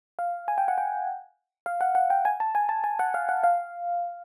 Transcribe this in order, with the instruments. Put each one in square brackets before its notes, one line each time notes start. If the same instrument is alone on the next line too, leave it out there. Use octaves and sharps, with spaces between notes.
[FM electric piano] F5
G#5
G5
F#5
G5
F5
F#5
F#5
G5
G#5
A5
G#5
A5
G#5
F#5
F5
F#5
F5